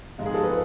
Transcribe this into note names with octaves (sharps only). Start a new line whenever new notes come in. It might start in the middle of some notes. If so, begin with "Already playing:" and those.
G#2 F3 G#3 F4
G#4
A4
B4